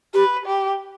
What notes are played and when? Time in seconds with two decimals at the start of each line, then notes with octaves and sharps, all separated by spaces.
0.14 G4 B4
0.46 G4